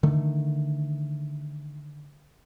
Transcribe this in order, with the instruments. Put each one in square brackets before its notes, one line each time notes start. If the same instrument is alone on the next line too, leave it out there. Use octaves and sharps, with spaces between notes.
[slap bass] D3 D#3 A3